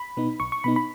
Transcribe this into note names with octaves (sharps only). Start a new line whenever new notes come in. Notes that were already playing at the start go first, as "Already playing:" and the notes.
Already playing: B5
B2 B3 D#4
B1 C#6
C#6
B2 B3 D#4 B5
B5